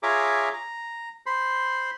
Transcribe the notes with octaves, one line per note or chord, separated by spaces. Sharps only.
F4 G#4 C#5 E5 A#5 D6
A#5
C5 B5 C6